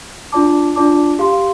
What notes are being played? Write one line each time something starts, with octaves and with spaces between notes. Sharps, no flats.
D4 F4 D5 A5 D6
D4 F4 D5 A5 D6
G4 F5 C6